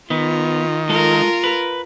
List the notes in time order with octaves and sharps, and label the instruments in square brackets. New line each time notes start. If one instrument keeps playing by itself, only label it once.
[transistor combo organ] D#3 [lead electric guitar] B3 [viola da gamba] F4
[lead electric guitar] G#3 A4 [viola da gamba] F4 A#4
[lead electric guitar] B4